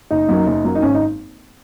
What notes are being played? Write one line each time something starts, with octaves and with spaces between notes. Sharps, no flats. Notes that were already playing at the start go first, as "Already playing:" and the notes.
F#1 D#4
F#2 F#3 A#3
F#1
F#2 F#3 A#3
D#4
G#1 C#4
D#4